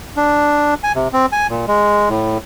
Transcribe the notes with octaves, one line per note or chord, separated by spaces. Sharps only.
D4
G#5
C3
C4
G#5
A#2
G#3
A2